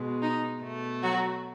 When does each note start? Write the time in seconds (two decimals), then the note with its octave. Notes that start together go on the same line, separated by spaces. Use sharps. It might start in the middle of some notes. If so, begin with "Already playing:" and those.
Already playing: B2 G#3
0.22 D#4
0.63 B2 A3
1.03 F#3 F#4